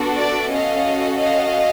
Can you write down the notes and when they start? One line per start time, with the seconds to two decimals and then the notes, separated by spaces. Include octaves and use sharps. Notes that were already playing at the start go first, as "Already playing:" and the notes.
Already playing: B3 D4 F#4 A4
0.18 D5 E5
0.51 C#4 F#4 A4 D#5 F5
1.18 D#5 F5